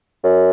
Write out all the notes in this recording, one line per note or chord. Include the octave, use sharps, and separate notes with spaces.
F#2